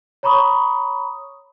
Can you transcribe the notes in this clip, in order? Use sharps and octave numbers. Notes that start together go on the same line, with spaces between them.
C#5 A#5 B5 C#6 D#6